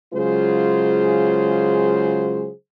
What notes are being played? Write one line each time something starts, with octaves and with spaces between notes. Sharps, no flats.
C#3 F#3 G#3 F4 G#4 C5